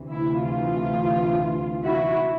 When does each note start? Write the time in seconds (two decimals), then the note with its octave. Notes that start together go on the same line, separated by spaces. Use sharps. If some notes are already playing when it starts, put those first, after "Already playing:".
Already playing: D2 C3 E3
0.13 E4
0.47 F4
1.83 E4 F#4